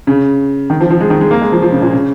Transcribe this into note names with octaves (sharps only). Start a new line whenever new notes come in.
C#3
D#3
F3
F3
G#3
D#3
G#3
A#3
G#3
F3
F3
C#3
A#2
C#3